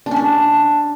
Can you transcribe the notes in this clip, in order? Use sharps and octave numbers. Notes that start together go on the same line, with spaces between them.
D4
C#4
D4